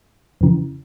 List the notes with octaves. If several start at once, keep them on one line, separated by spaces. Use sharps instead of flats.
F2 C#3 E3